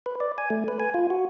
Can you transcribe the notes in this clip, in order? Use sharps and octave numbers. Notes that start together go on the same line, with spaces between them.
B4
D5
G#5
A3
B4
G#5
F4
F#4